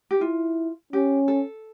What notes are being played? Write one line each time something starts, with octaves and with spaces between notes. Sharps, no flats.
G4
E4 F4
C#4 G4
A4